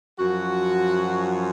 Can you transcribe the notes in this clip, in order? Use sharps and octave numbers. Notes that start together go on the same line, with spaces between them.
F#2 F3 F#4